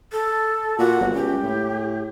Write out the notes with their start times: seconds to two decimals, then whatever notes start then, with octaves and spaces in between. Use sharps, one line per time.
0.12 A4
0.79 A#2 F#4
1.01 G1
1.14 C#2 G4
1.43 A2